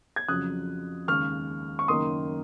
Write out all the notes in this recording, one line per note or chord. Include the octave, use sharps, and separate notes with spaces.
G#6
F2 C#3 F#3 D#6 F#6
D#2 C#3 G#3 C#6 F6
C#6
F#1 F#2 D#3 A#3 C6 D#6